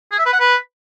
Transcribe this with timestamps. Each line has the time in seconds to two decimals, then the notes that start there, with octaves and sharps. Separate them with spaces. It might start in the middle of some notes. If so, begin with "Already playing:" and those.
0.11 G#4
0.18 E5
0.25 B4
0.33 F#5
0.40 B4